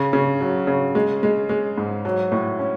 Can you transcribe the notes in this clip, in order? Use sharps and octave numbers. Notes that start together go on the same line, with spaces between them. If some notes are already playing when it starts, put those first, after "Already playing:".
Already playing: C#3
C#3
F#3
C#3
G#3
G#3
G#3
G#2
F#3
A2
C#4